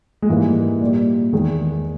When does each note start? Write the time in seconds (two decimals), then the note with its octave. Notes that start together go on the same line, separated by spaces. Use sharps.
0.22 G#3
0.29 G#2 E3 G3 A#3
0.81 A#2 G3
1.33 E2 D#3 G#3